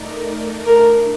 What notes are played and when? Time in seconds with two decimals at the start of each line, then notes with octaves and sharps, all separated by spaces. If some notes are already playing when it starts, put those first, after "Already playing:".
Already playing: A3 D#4 A#4 D5
0.66 A2 A3 D4 A#4